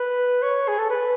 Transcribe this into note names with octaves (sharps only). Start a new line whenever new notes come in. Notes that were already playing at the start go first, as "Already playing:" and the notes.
Already playing: B4
C#5
G#4
A4
B4